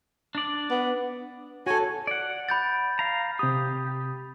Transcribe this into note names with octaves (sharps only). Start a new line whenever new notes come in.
D4 D5
B3
F#4 A4 C#5 G#5
D5 F#5
B5 G6 A6
F5 A#5
C3 G4 D#6